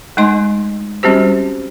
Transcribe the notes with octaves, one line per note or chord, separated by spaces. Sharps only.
G#3 A3 D#4 D#5 C6
G3 C4 C#4 F#4 G4 C5